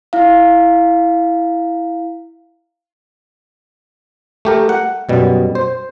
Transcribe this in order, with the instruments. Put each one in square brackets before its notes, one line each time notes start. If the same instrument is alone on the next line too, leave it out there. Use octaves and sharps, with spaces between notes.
[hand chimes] E4 F5
[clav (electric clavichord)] A3 G4 A#4
F#5
F#2 B2 G3
C5